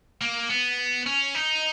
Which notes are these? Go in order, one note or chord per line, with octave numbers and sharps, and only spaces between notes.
A#3
B3
C#4
D#4